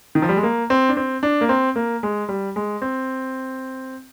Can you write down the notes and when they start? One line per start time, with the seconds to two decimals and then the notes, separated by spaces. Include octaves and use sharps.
0.15 D#3
0.22 F3
0.29 G3
0.37 G#3
0.43 A#3
0.70 C4
0.89 D4
0.97 C4
1.23 D4
1.41 A#3
1.49 C4
1.76 A#3
2.03 G#3
2.29 G3
2.56 G#3
2.82 C4